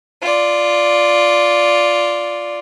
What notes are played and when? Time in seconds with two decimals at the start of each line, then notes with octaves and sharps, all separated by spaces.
0.21 F4 D5